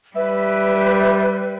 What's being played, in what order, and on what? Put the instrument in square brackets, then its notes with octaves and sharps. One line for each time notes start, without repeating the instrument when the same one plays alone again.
[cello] G3 [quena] B4 [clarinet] E5